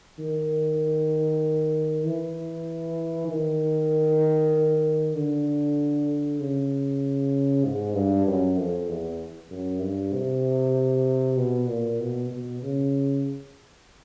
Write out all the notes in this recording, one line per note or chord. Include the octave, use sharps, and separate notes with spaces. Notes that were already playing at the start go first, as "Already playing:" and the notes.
D#3
E3
D#3
D3
C#3
G#2
G2
F#2
F2
E2
F#2
G2
C3
B2
A#2
B2
B2
C#3